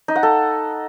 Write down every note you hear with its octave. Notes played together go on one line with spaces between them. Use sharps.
D#4
F#5
A4